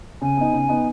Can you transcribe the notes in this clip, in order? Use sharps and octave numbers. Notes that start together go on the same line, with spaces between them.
C#3 G#5
B3 D#4
C#3
B3 D#4